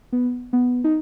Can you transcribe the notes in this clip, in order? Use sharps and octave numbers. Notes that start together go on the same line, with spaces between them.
B3
B3
D#4